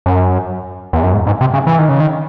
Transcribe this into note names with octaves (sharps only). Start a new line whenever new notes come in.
F#2
E2
F#2
G#2
G#2
C3
C#3
E3
D#3
C#3
D#3